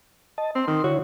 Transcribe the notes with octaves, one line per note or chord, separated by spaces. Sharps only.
D#5 A5
C4 C6
D#3
D3 E4 F#4 C#5